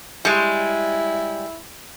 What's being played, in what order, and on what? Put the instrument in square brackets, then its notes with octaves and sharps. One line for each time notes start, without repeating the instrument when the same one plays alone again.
[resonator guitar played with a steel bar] G3 G#3 [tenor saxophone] E4